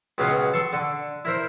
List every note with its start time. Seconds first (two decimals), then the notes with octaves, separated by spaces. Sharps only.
0.18 C#2 B2 F#3 F5 D#6
0.53 A4 C6 C#6
0.73 D3
1.25 E4 A#4 C5